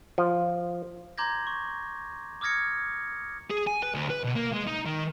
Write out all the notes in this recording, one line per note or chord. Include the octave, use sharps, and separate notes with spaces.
F3
A#5 C6 D6 G6 G#6 A#6
C#6
D6 D#6 F6 G#6 A#6 C#7
G#4
G#5
B4
D2
B4
B2
A#3
G#3
D#4
D#3